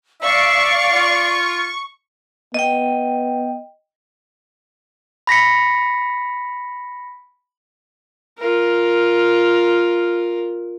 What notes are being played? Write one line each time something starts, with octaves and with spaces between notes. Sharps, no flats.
D5 E5 F5 C#6
F4
B3 D#5 G5
B5 A#6 B6 C#7
F4 A#4